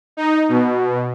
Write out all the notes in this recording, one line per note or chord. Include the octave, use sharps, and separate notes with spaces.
D#4
B2